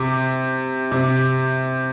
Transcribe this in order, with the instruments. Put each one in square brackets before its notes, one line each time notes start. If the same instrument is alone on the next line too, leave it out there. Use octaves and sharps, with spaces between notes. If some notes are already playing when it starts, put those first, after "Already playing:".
Already playing: [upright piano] C3
C3